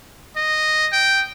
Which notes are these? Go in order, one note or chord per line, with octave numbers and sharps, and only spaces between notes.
D#5
G5